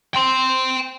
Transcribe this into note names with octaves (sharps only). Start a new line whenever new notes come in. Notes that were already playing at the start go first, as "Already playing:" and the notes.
G5 C6